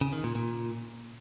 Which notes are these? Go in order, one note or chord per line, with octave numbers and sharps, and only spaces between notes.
C#3
D#3
A#2
A#2